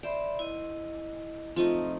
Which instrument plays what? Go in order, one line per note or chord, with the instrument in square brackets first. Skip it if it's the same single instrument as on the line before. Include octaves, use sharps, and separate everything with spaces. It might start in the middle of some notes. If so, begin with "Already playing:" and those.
[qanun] C5 [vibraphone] D5 E5 B5
[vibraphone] E4 D#5
[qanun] F3 A3 D#4 [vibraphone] C4 F4 D#5